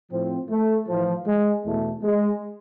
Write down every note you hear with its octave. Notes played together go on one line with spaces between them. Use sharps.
A2 F3 C4
A3
A2 E3 F3
G#3
E2 B2 A3
G#3